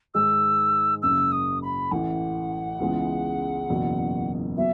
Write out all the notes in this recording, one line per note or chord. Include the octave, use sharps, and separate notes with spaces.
G#2 D#3 G#3 E6
F#1 F#2 C#3 E6
D#6
B5
A1 A2 E3 F#5
C#2 C#3 E3 G#3 B3
F#1 E2 B2 F#3
F#3 B3 E5